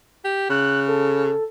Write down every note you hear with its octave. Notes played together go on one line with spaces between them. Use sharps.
G4
C#3 F#6
A4